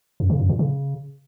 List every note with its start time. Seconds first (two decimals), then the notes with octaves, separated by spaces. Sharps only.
0.20 F#2
0.30 C#3
0.40 F#2
0.49 A#2
0.59 C#3